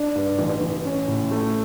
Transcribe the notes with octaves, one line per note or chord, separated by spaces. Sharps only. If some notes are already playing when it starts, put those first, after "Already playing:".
Already playing: D4
G2
A1
A1
C#4
A2
A3